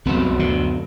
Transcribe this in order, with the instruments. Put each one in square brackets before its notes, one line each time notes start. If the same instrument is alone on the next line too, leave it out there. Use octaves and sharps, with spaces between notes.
[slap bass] C2 C3 [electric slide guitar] F#2 F#3 B3 F#4 A4
[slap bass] D2 D3